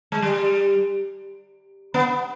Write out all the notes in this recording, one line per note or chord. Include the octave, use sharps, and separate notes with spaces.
G#3
G3
B3